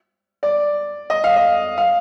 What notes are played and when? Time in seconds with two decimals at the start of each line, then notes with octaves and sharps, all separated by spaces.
0.43 D5
1.10 D#5
1.24 F5
1.36 D#5
1.78 F5